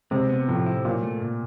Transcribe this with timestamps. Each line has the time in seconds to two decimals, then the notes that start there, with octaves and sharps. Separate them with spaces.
0.11 C3 G#3
0.30 B3
0.48 A2 F3
0.66 E4
0.85 A#2 F#3
1.03 A3
1.22 A#2